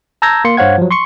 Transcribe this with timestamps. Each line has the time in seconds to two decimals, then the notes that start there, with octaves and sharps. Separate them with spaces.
0.22 A5 A#5 E6 G6 G#6 A#6
0.45 A#3 C6 C#7
0.57 G2 C5 C#5 F5 F#5 G#6
0.78 F3 F#3
0.91 C6 C#6 C#7